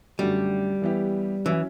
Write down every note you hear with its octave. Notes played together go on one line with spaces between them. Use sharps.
F#2 D3 G3 A3 D4 F#4
E3 B3 E4 G4
E3 F#3 C#4 E4